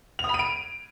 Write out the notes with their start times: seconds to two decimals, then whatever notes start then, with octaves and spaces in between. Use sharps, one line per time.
0.19 F7
0.24 D#6
0.29 B5
0.34 D#7
0.39 D7